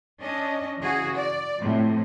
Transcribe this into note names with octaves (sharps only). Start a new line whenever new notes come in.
C#4 D4 D#5
C#3 E3 F#4 G#4
D5
A2 C3 F3